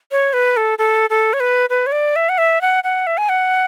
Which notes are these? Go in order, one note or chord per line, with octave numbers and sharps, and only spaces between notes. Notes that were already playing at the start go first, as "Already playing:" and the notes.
C#5
B4
A4
A4
A4
C#5
B4
B4
C#5
D5
E5
F#5
E5
F#5
F#5
E5
G#5
F#5